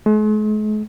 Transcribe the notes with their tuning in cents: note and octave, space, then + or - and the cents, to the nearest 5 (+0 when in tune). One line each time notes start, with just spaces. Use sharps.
G#3 +45